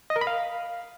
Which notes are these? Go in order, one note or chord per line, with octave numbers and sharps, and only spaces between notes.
D#5
A#4
B5
F5